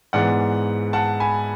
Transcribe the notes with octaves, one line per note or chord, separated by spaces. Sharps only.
G#2 E3 B3 D5 F#5
F#5 A5
G#5 B5